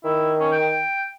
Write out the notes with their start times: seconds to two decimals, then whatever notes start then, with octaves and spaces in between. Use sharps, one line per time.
0.04 D#3 E4
0.40 C#4
0.52 G5